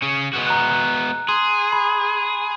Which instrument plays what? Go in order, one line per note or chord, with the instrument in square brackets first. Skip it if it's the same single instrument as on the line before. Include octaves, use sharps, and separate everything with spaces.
[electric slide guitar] C#3 C#4
G#3 B3 F#4
[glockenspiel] A#5 F#6
[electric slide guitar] G#4 [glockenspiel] C6
[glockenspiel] B5